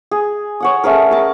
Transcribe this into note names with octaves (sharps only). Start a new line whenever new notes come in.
G#4
C#5 F#5 D#6
A3 C#4 G#4 A#4
A#4 A5